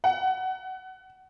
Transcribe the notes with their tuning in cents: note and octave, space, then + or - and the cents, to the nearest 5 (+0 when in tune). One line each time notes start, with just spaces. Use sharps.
F#5 +30